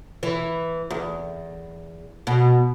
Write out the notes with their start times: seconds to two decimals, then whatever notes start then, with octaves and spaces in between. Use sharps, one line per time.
0.23 E3
0.90 E2
2.27 B2